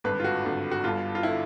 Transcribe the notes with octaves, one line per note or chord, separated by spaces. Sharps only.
G#1 G2 D3 B4
F4
F#4
G#1 G2 D3
F#4
G1 G2 D3 F4
F4
D3 E4